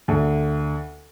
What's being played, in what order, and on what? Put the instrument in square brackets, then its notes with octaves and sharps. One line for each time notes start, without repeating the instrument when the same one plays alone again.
[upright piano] D2